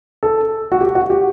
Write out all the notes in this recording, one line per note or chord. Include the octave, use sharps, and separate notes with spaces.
A4
F#4
G4
F#4
G4